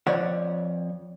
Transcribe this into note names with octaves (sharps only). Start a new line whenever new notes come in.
F2 C#5 D5 F#5